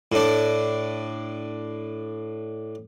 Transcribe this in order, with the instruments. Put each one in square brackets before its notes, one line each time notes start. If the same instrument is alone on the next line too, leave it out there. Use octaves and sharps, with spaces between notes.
[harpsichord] A2 D4